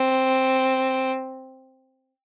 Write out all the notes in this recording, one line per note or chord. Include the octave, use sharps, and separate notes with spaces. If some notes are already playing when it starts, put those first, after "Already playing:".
Already playing: C4